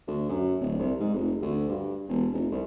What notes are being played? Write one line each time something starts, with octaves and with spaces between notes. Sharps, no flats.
D2
F#2
D1
C2
G#2
F1
D2
G2
E1
F1
C2